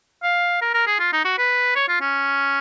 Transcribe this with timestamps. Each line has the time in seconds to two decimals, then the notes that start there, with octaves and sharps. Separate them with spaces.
0.23 F5
0.61 A#4
0.74 A#4
0.87 G#4
0.99 F4
1.12 D#4
1.25 F#4
1.38 B4
1.76 C#5
1.88 F4
2.01 C#4